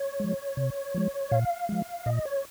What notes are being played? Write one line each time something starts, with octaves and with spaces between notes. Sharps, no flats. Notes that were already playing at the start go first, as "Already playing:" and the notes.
Already playing: C#5
F3 G#3
C3
F3 G#3
A#2 F5
F3 G#3
A#2 D#5
C#5